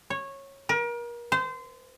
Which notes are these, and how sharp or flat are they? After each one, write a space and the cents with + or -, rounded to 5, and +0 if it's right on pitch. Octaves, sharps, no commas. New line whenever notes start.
C#5 -15
A#4 +35
C5 -25